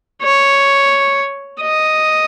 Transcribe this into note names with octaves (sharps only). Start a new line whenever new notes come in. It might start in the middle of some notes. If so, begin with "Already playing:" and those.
C#5
D#5